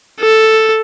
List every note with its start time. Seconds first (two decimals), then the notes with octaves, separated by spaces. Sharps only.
0.20 A4